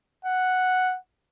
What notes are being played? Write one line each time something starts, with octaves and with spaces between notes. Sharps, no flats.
F#5